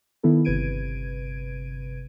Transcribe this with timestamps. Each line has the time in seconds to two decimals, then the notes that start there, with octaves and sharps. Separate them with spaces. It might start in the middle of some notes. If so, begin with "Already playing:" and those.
0.23 D#3 B3 E4 A4
0.45 G1 C3 B4 G#6 D7 D#7